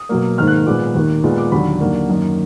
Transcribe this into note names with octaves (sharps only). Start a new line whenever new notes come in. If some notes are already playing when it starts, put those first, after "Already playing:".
Already playing: D#6
B2 F#3 A#3
G#2 D#3 A#3 F6
F#6
A#2 G#3 B3 D6
D#2 D#3 A#3
A#2 G#3 B3
D6
D#2 D3 F#3 B5
D#2 D3 F#3 A#3
F#2 D#3 A#3